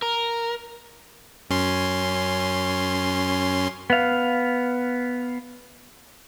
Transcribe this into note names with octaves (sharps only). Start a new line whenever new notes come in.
A#4
F#2 C#4 C6
B3 F5